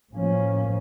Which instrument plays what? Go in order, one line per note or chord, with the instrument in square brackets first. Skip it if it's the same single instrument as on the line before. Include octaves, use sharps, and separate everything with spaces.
[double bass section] A2 F3 A#3 C#4